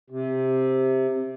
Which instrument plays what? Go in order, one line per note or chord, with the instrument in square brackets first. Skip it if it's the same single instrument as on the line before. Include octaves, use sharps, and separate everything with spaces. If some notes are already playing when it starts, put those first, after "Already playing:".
[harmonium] C3